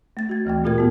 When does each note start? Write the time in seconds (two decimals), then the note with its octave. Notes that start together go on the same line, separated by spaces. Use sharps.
0.17 A3 A6
0.29 F#4 G#6
0.45 D2 E3 A3 G5
0.64 A#2 A#3 F4 G4 A#4 G#6
0.76 A2 B3 F#4